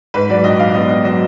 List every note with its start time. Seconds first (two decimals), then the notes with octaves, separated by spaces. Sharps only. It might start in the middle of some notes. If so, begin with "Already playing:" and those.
0.14 G#2 B4
0.30 F#3 D5
0.44 A#1 D#5
0.59 G#2 F5
0.74 B3 D#5
0.89 B3 D#5
1.04 F#3 D#5